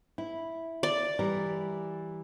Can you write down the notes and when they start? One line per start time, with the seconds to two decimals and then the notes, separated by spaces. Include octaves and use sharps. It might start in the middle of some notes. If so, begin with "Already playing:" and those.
0.18 E4
0.83 D5
1.19 E3 G3 A#4